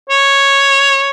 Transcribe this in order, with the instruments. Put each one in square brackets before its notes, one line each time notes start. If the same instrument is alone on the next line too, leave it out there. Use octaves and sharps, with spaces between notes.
[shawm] C#5